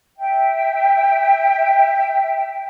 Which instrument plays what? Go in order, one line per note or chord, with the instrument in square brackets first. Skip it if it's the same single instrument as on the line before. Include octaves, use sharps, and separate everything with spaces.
[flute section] E5 G5